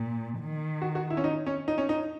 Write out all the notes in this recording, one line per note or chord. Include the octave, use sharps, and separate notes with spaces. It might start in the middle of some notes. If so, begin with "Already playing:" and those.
Already playing: A#2
D#3
F#4
F#4
E4
C#4
D#4
C#4
D#4
C#4
D#4